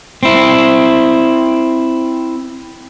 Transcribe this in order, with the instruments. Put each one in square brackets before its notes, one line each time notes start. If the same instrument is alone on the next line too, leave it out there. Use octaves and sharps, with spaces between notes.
[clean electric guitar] C4 E4